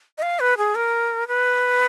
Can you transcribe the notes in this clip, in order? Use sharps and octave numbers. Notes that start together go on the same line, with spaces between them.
D#5
F5
B4
G#4
A#4
B4